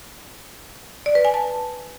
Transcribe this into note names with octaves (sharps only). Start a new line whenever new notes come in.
D5
B4
G#5
A5